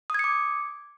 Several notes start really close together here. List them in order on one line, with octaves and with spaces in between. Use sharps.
D#6 G#6 C#7 D6